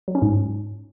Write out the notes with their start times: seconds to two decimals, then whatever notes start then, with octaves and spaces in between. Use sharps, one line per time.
0.08 F#3
0.15 C#4
0.22 G#2